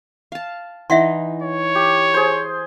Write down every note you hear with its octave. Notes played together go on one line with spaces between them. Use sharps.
F5 A5
E3 D#4 E5 F#5 C6
C#5
G4
G#4 C5